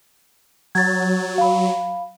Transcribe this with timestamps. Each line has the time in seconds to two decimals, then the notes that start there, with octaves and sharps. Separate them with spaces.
0.75 F#3 G#6 A6
1.38 F5 B5